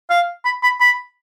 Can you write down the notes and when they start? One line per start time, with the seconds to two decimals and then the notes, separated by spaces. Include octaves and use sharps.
0.10 F5
0.45 B5
0.63 B5
0.80 B5